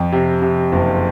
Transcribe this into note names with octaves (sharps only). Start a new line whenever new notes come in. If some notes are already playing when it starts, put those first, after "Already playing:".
Already playing: F2
C3
C3
F#1